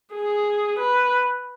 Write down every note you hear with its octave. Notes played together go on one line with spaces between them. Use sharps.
G#4
B4